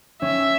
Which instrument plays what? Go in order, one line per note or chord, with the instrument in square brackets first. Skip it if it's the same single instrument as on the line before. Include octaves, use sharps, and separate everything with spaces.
[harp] C#4 [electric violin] E5